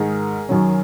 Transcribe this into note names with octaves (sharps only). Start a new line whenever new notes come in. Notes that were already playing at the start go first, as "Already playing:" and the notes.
Already playing: G#2 D#3 G#4 A#4
F#2 D#3 F#3